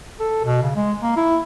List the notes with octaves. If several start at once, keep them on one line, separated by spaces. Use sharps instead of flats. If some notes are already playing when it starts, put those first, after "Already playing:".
A4
B2
C#3
G#3
A#3
E4